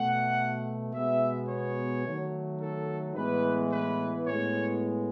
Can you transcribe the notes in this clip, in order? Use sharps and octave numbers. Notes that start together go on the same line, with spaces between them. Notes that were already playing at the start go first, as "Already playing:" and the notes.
Already playing: B2 A3 F#5
B2 G#3 B3 E5
C#5
D#3 F#3 A3
A4
A2 E3 G#3 B3 B4
B4
A2 G#3 B3 C#5